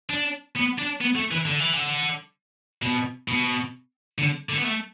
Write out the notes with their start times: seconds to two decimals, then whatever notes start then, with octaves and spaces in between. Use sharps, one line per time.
0.10 D4
0.56 B3
0.78 D4
1.01 B3
1.15 A3
1.31 E3
1.46 D3
1.60 E3
1.73 D3
2.82 B2
3.28 B2
4.18 D3
4.49 D3
4.57 B3
4.64 A3